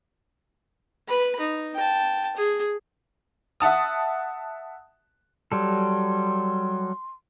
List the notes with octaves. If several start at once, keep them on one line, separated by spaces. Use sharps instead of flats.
B4 B5
D#4
G5 A5
G#4
E5 F#5 A5 D#6
F#3 G3 A4 C6